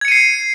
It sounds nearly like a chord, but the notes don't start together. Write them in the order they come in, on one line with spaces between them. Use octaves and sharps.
G#6 C#7 D#7 C7